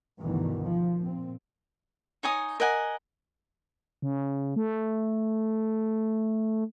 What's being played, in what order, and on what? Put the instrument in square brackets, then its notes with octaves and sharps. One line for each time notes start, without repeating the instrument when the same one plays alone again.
[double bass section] D2 G2 B2 D#3 E3
F3
A#2 C4
[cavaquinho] D#4 C#5 G#5 D#6
A#4 D#5 F#5 G#5
[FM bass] C#3
A3